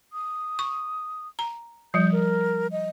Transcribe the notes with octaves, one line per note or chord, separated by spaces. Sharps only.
D#6
C#6
A#5
F3 G3 G6
A#4
D#5